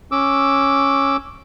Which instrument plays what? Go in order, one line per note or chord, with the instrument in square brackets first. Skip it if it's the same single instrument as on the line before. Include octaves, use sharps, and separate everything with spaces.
[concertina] C#4 D6 E6